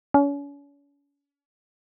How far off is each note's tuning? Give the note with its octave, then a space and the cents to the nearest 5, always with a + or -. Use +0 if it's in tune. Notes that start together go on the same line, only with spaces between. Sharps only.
C#4 +40